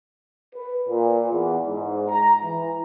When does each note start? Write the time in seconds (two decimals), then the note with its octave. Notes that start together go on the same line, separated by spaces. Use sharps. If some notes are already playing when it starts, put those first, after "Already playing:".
0.55 B4
0.88 A#2
1.32 E2
1.66 G#2
2.08 A#5
2.43 E3